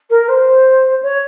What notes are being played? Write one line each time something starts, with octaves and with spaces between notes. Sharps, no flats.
A#4
C5
C#5